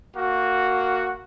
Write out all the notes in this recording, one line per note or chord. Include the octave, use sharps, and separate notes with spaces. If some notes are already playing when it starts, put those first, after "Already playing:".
A#3 F#4